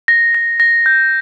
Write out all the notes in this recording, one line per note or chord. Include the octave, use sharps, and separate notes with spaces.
A#6
A#6
A#6
G6